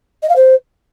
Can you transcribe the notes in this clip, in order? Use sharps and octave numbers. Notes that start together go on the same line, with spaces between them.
D#5
F5
C5